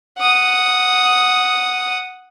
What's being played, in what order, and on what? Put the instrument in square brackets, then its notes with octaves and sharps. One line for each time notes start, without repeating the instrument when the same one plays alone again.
[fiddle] F#5 D#6